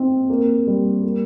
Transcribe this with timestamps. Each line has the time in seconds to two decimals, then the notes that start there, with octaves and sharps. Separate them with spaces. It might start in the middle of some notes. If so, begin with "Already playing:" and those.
Already playing: C4 D#4
0.30 A#3
0.67 G3
1.04 A#3